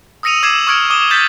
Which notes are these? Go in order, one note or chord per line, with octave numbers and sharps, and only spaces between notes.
D#6 E6 A#6 C#7 D#7 F7
D6 E6 G#6 C7 E7 F#7
C#6 D#6 F6 G#6 C#7 D7
D6 D#6 G7
G6 A6 B6